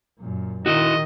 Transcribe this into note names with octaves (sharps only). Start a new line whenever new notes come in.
F#2 A#2
A#2 D#3 E4 F#4 D#5